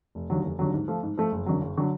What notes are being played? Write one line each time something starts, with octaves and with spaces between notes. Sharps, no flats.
F1
D#2 D3 F#3
F1
D#2 D3 F#3
G#2
F3 A3
G#2
F3 A3
F#1
F#2 D3 F#3
F#1
D3 F#3